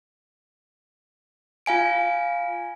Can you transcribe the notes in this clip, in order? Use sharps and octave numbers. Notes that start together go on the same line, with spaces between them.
F4 F5 G#5 D7